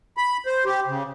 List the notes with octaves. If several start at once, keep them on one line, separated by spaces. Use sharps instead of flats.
B5
C5
G4
C#3